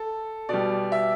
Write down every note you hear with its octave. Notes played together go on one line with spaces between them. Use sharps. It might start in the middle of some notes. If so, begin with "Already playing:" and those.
Already playing: A4
B2 G3 D5
E5